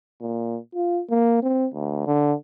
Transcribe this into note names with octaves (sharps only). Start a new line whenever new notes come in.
A#2
F4
A#3
C4
D2
D3